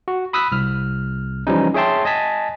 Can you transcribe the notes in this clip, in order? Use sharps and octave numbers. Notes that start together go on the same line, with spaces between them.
F#4
B5 D#6 E6 F#6 B6
C2 F6
E3 F3 G3 C#4 D#4
G#4 C#5 E5 G5 A5 C6
D#5 G#5 A5 B6